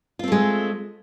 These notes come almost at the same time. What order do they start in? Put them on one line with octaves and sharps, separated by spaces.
F4 C4 A3 G#3